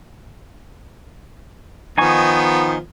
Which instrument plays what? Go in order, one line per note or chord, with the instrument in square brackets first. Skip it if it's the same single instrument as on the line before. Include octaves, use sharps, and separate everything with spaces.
[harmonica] D#3 F3 B3 [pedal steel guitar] D#4 G#5 C#6